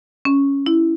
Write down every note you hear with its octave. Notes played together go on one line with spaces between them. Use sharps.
C#4
E4